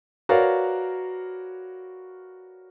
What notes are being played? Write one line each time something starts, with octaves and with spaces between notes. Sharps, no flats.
F#4 A#4 B4 C#5 D5 F5